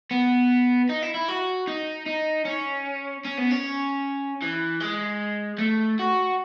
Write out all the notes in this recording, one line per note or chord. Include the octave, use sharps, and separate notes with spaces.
B3
D#4
E4
E4
F#4
D#4
D#4
C#4
C#4
B3
C#4
E3
G#3
A3
F#4